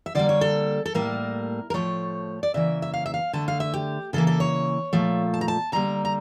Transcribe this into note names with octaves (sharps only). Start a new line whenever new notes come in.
E5
D3 G3 A#3 D5
C#5
A4
A4
A2 G3 A#3 A#4
A#4
A2 F3 A3 C#5
D5
C#3 E3 A#3 E5
E5
F5
E5
F5
D3 A3 A5
F5
E5
G4
C#3 E3 A#3 A4
A4
C#5
A#2 F3 A3
A5
A#5
A5
D3 G3 A#3 A#5
A#5